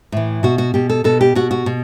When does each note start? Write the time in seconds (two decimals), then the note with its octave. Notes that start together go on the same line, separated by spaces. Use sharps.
0.12 A2 E3
0.43 B2 F#4
0.58 F#4
0.74 B2 G4
0.90 A4
1.04 B2 A4
1.21 G4
1.35 B2 F#4
1.51 F#4
1.66 B2